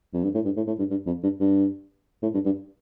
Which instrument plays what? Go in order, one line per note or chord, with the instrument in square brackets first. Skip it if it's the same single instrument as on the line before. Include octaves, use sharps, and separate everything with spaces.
[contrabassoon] F2
G2
A2
G2
A2
A2
G2
G2
F2
G2
G2
A2
G2
G2